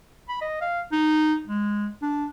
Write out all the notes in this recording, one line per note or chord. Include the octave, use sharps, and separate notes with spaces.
B5
D#5
F5
D#4
G#3
D4